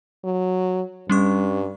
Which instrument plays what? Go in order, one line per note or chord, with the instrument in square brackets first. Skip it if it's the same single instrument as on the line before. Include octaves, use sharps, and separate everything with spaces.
[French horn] F#3
[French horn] G2 [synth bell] G3 C#4 C#6